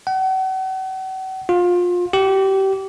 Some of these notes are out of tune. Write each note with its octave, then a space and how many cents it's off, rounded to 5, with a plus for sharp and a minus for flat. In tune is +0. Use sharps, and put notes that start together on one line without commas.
F#5 +40
F4 +25
G4 -25